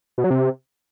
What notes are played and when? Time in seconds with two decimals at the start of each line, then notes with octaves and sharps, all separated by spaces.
0.18 B2
0.24 F#3
0.30 C3